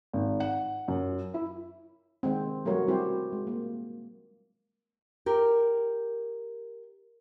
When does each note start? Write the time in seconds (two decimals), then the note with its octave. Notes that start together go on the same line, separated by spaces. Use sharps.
0.13 G#1
0.40 F#5
0.88 F#2
1.34 E4
2.23 D#3 G#3 C4
2.65 F#3 G3 A3 F#4 A#4 C#5
2.88 G3 C4 E4 F#4 G4 C5
3.32 G#3
3.47 A#3
5.26 G4 A#4